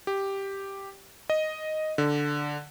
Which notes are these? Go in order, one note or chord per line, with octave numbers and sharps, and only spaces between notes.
G4
D#5
D3